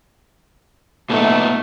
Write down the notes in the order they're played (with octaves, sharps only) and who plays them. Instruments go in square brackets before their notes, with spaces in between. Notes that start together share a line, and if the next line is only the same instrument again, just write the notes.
[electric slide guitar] A#2 B3 D#4 [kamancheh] A3